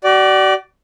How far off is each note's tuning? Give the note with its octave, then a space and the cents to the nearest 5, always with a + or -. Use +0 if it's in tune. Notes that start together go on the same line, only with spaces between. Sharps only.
F#4 +45 D5 +0